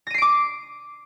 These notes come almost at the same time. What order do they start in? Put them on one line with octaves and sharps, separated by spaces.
A#6 D#7 C7 D7 D6